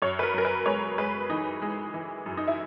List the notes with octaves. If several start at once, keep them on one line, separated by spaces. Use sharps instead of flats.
F#2 C#5
B4
A#4
F#2 A#4
B4
G#3 C#5
G#3 B4
E3 D#4
G#3
E3
F#2
D#4
E4